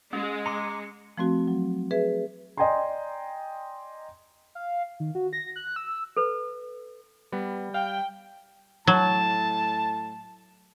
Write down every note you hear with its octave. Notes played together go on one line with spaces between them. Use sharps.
G#3 C#4
A#5 C6 D6 C#7
F3 A3 C4 F#4
F#3
G#4 B4 E5
D5 D#5 G5 G#5 A#5 C6
F5
D#3
F#4
A#6
F#6
E6
A4 B4
G3 B3
F5 G5
A2 F#3 A5